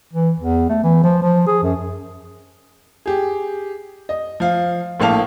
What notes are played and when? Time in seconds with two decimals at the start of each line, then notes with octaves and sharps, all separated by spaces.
0.13 E3
0.40 E2
0.69 A3
0.84 E3
1.03 F3
1.22 F3
1.47 G#4
1.63 F#2
3.06 G4 G#4
4.09 D#5
4.40 F3 F5
5.00 A#1 A2 A#3 F5 A5 F7